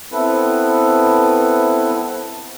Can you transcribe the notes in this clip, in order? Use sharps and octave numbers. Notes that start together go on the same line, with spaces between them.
B3 C4 E4 A4 B4